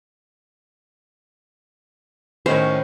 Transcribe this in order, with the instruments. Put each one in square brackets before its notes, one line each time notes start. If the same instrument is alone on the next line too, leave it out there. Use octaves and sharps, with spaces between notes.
[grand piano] A2 D#3 C#4 [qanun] C5